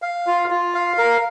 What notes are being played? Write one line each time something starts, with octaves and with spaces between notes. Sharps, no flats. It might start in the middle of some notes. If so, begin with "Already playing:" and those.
F5
F4
F4
F5
A#4